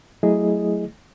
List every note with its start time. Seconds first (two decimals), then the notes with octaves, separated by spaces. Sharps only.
0.23 F#3 A3 E4 G#4 D#5